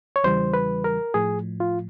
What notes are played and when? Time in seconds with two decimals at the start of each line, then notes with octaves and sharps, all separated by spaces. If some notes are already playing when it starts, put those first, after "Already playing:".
0.16 C#5
0.24 E2 C#3 E3 G3 C5
0.54 B4
0.84 A#4
1.14 A2 F3 G#4
1.60 F4